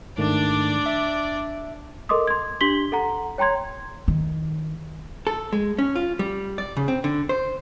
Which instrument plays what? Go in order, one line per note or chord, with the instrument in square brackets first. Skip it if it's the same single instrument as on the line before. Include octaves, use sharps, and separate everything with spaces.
[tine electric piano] G#2 D#3 A3 [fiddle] D4 D5
[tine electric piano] E5
[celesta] A4 A#4 D#5 C6 D6 D#6
C6 G#6
D4 G4 C6 B6 F#7 G7
A4 F#5 A#5
C#5 G5 A#5 C6 G#6
[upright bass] D#3
[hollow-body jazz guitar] A4
G#3
C#4
F4
G3
D5
C#3
C4
D3
C5